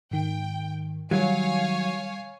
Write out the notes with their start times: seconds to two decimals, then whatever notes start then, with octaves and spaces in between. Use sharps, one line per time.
0.11 G#2 D#3 G5
1.11 D#3 F#3 G3 C#5 F5 G#5